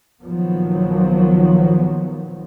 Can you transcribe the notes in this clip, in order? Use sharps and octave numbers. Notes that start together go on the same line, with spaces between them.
A#1 D#3 F3 F#3 B3